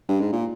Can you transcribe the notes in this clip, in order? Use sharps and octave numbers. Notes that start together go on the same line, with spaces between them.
G2
G#2
A#2